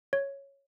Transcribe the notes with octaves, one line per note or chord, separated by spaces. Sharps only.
C#5